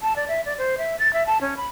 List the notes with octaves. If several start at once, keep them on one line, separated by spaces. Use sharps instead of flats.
A5
D5
E5
D5
C5
E5
A6
E5
A5
C#4
B5